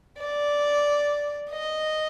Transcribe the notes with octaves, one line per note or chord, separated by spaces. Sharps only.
D5
D#5